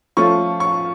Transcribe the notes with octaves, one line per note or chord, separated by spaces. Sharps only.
F3 A3 C#4 F4 C#6
C#6